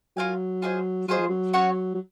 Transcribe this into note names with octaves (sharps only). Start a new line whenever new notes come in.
F#3 F4 A#4 F5 G#5
F4 G#4 C5 D#5
F#3 F4 G#4 C5 D#5
F3
F#3
C#4 F#4 C#5 F#5
F#3